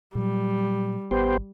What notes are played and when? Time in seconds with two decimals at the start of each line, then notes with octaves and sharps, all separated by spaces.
0.15 A#2 F#3 G3
1.11 G#1 B3 G4 C5